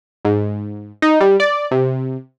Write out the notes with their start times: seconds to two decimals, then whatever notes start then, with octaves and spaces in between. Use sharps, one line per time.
0.25 G#2
1.02 D#4
1.21 G3
1.40 D5
1.71 C3